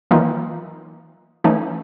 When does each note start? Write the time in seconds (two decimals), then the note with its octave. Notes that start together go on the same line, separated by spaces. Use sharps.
0.11 D#3 E3 F#3 A#3 D#4 F4
1.44 E3 A3 C#4 D#4